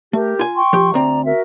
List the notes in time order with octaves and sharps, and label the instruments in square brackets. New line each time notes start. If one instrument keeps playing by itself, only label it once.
[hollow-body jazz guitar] A3 [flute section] G4 A#4
[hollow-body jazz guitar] F4 G#5
[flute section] G5 C6 C#6
[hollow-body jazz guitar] F3 G4
[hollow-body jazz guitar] D2 C4 [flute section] D5 A#5
[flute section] F#4 A#4 E5